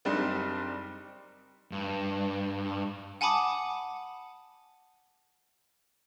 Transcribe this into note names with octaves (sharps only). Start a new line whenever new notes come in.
F#1 G3 C4 D4 D#4
G2
F#5 G#5 A5 B5 D6 D#6